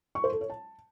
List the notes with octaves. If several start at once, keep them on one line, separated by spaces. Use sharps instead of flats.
C#6
C5
A4
C#5
A5